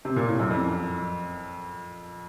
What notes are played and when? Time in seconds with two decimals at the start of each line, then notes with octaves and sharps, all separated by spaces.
0.05 C3
0.16 A#2
0.27 A2
0.39 F#2
0.50 F2